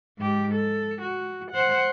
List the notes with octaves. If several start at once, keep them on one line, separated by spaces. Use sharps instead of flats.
G#2 G4
A4
F#4
C5 F#5